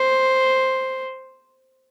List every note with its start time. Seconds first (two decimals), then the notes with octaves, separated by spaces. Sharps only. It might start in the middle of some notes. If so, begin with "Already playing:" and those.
Already playing: C5